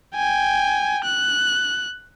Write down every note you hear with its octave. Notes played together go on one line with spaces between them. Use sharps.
G5 G#5
F#6